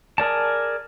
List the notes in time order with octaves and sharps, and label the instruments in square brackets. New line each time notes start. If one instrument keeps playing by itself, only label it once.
[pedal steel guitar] G#4 A#4 D5 A5